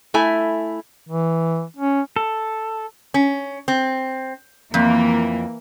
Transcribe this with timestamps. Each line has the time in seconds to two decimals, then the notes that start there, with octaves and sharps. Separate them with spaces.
0.14 A3 E4 G#5
1.09 E3
1.77 C#4
2.16 A4
3.14 C#4
3.68 C4
4.74 F2 E3 A#3